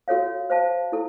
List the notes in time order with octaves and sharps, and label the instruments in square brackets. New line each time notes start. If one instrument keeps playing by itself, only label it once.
[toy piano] F#4 A4 C#5 F5
C5 F5 A5
E4 A4